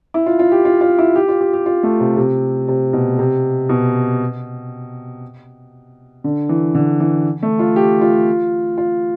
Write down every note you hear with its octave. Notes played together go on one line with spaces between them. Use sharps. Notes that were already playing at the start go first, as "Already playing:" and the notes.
E4
F4
F4
G4
F4
F4
E4
G4
F4
G4
G4
F4
A3
C3
C3
C3
B2
C3
B2
D3
E3
D3
E3
A3
F4
G4
F4
F4